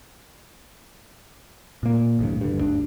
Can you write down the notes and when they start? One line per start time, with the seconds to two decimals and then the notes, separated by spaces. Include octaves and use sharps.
1.83 A#2 A#3
2.19 A1 D2 G2
2.41 G2 D3
2.58 G1 D2 D4